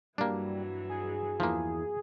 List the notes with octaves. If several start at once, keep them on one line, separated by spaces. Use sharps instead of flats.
G2 E3 F#3 G3 A#3 D4
G#4
E2 F3 A#3 E4 G#5